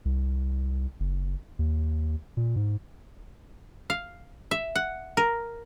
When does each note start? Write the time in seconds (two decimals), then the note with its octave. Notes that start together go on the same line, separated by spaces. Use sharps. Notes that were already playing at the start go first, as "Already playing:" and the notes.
0.05 C2
1.00 F#1
1.59 D#2
2.37 A#2
2.56 G#2
3.90 F5
4.51 E5
4.75 F#5
5.17 A#4